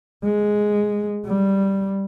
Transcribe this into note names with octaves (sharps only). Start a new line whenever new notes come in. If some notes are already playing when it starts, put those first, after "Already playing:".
G#3
G3